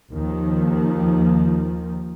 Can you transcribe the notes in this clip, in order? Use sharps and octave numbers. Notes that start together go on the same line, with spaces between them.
D#2 D#3 F3